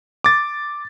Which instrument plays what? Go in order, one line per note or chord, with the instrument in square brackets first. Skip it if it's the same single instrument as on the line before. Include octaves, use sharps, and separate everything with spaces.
[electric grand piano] D6 A6